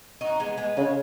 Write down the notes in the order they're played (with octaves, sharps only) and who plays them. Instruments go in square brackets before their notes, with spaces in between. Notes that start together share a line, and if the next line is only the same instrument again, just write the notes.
[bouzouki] D#4 F#4
G#3 B3
G#3 B3
[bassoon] C#3 [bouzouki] G#3